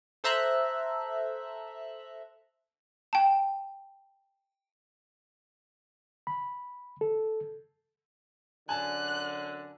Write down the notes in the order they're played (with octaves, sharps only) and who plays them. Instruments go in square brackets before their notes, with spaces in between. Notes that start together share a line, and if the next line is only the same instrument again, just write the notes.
[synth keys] A4 C5 E5 A#5 F#6
[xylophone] G5 A5
[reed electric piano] B5
A4
[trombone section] F#2 D3 [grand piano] G#5 A5 [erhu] F#6